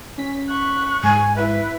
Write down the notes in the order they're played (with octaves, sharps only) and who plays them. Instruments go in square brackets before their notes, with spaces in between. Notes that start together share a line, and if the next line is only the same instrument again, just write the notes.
[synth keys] C#4 B6
[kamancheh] C#6 F#6
[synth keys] G#2 [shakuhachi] G#5
[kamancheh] E4 [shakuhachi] B4